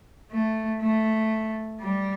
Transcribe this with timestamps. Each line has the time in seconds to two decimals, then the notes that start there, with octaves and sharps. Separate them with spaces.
0.32 A3
0.81 A3
1.81 G3